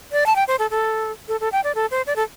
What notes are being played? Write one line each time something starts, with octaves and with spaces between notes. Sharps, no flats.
D5
A5
G5
C5
A4
A4
A4
A4
G5
D5
A4
C5
D5
A4